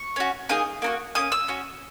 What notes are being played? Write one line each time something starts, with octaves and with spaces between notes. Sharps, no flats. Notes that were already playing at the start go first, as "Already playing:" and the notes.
Already playing: C#6
C#4 F#4
A#3 D#4 G#4 D#6
A#3 D#4 F#4
A#3 C#4 D#6
E6
C#4 F#4